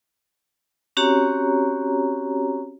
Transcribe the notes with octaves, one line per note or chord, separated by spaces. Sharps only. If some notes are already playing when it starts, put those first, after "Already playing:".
C4 C#4 F#4 G4 C#5 A#5